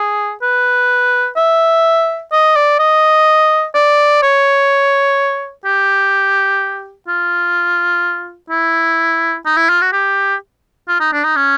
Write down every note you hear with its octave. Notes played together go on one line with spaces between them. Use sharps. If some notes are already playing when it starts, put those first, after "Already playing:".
Already playing: G#4
B4
E5
D#5
D5
D#5
D5
C#5
G4
F4
E4
D#4
E4
F4
F#4
G4
F4
D#4
D4
D#4
C#4